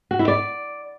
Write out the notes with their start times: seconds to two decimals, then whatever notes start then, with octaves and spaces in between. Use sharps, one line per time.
0.11 F#4
0.19 E4
0.28 D5